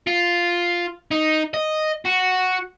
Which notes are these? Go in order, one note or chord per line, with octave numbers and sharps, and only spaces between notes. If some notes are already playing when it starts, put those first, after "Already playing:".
F4
D#4
D#5
F#4